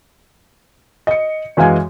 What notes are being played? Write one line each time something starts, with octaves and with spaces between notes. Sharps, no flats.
D#5 C#7
F#2 E3 G#3 F5 G#5